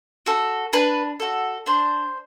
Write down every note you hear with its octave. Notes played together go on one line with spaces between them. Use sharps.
F#4 A4
D4 B4
F#4 A4
D4 C5